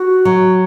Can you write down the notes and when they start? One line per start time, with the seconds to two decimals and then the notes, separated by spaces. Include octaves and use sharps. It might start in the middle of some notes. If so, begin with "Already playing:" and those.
Already playing: F#4
0.25 F#3